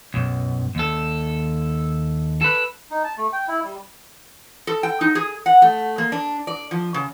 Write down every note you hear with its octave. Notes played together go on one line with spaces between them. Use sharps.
B1 F#2
D#2 A4
A4 B4
D#4
A5
A3
G5
E4
G3
A4
G5
D#4
G#4
F#5
A3
A#3
D4
D5
F3
C#3